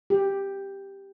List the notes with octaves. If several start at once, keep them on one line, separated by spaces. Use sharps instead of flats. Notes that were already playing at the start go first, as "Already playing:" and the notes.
G4